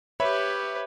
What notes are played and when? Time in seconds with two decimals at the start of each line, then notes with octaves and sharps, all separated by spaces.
0.20 G4 B4 C#5 E5 B5